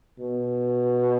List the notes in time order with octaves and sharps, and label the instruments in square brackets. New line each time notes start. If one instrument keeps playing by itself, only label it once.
[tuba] B2